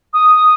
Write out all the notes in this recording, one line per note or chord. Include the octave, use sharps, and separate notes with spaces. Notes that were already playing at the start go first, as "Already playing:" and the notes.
D#6